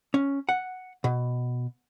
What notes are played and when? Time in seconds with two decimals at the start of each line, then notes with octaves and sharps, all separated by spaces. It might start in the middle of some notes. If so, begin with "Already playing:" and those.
0.14 C#4
0.49 F#5
1.04 B2